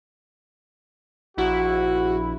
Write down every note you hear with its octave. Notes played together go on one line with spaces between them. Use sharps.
A#1 E4 F#4